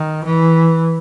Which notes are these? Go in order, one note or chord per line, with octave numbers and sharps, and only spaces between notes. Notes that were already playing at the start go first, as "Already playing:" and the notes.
Already playing: D#3
E3